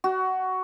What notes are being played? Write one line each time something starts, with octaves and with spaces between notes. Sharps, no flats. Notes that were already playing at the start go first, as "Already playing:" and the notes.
F#4